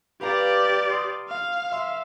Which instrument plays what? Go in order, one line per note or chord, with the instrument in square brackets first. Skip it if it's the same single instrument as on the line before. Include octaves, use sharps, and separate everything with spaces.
[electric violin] G4 D5 [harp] B4 F5 A#5
[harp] C6 D#6
[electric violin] F5
[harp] E5 C6 E6